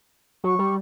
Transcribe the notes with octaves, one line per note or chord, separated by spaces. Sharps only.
F#3 C#6
G3